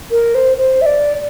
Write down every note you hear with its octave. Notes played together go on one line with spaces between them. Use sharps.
A#4
C5
C5
E5
D5